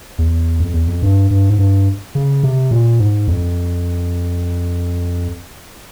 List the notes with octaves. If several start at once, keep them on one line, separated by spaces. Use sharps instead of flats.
E2
F2
E2
F2
G2
G2
G#2
G2
C#3
C3
A#2
G#2
F2